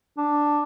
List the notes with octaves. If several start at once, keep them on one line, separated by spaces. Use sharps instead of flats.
D4